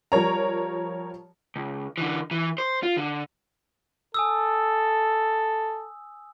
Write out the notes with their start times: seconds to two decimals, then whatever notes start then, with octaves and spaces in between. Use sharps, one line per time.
0.12 F3 G3 A#4 C#5 A#5
1.56 C#2
1.98 D3 E3
2.31 E3
2.58 C5
2.83 F4
2.97 D3
4.14 A4 G#5 D#6 E6